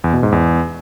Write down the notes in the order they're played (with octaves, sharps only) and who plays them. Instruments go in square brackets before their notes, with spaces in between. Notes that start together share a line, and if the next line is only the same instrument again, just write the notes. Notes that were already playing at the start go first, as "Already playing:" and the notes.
[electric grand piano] E2
B2
G#2
E2